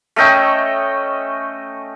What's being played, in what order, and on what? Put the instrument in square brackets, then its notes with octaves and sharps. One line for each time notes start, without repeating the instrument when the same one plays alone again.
[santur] A3 C#4 D#5 G5